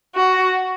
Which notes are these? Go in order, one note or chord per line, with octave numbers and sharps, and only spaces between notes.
F#4